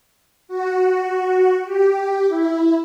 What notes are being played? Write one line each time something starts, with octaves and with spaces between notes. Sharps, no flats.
F#4
G4
E4